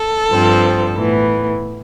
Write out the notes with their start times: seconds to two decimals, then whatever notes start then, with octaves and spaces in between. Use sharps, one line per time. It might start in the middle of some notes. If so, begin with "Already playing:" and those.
Already playing: A4
0.30 G2 F3 C4
0.95 A2 E3 B3